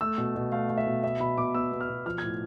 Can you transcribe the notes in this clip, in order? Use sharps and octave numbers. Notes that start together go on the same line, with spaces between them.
A3 E6
B2
B2
A3 F5
A3
E5
B2
B3 E5
B2 B5
B2 D6
B3 E6
B3
F6
B2
F3 F6
A2 G#6